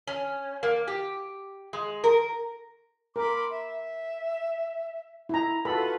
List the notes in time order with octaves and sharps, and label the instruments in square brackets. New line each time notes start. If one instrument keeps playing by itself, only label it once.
[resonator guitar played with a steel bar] C#4
A#3
G4
G#3
A#4
[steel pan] A#4 [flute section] B5 C6 D6
[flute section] E5
[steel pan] E4 A#5
[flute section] F4 F#4 B4 [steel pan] A4 B5